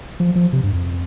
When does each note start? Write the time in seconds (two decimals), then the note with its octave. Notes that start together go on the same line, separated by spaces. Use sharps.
0.20 F3
0.35 F3
0.53 C3
0.63 G2
0.73 F2